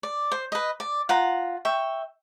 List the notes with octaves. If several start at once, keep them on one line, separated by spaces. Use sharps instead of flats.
D5
C5
B4 D#5
D5
F4 F#5 A#5
E5 G5 C#6